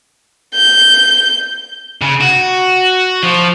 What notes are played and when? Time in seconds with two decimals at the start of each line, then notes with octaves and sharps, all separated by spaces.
0.55 G6
2.02 C#3
2.21 F#4
3.23 F3